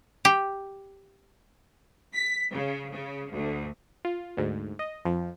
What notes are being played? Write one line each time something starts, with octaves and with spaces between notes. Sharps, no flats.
G4
B6
C#3
C#3
D2
F4
D2 G#2
D#5
F2 F3